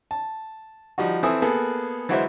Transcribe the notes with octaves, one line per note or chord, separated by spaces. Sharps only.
A5
F3 G3 D#4 F#4
E3 C4 A4 E5 G#5 D#6
A#3 B3 G#4 A4 B4
E3 F#3 G#3 F#4 C5 E5